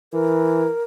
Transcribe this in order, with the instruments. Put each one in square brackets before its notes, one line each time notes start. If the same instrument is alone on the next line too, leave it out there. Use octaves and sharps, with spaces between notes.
[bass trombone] E3 [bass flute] A#4